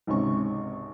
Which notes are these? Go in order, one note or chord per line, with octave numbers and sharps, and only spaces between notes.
G#1 C#2 C3 C#4 C#6